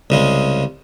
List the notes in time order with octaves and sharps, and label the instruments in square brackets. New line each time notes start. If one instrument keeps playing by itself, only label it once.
[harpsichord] C2 C#3 G#3